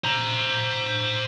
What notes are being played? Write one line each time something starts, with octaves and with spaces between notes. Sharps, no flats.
C5 A#5